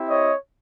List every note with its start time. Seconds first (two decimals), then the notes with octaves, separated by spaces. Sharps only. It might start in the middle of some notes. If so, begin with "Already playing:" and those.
Already playing: C4 E4 G4
0.10 C#5 D#5